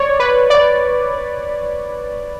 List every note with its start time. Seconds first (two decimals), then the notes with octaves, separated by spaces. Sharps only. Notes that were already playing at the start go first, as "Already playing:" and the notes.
Already playing: C#5 D5
0.20 B4
0.50 D5